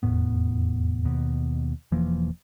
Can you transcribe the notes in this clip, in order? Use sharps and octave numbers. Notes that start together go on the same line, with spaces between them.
F1 E2 A2 B3
D#2 B2
E1 E3 F3 A#3